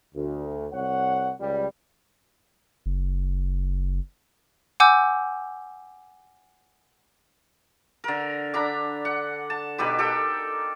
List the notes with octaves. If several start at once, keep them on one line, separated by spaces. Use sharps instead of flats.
D2
C2 C#5 F#5
C#2 G3
F#1
F#5 G#5 D6 E6 G6
D3 A#4
D3 D4 A#5 B5
F#5
A5
B2 D#4 G4 B4
G4 A4 A#4 G5